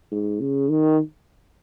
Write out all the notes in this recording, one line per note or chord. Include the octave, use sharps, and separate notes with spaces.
G#2
C#3
D#3